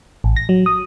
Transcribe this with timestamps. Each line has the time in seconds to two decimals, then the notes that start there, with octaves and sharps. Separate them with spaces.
0.24 A1
0.36 A#6
0.49 F#3
0.66 D#6